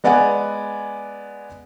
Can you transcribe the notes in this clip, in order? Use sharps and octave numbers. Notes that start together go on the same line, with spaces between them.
G#3 B3 D5 F#5 G#5